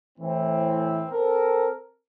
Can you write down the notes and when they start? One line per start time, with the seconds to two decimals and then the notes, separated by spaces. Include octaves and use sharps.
0.19 A2 E3 C4
1.10 C4 A4 A#4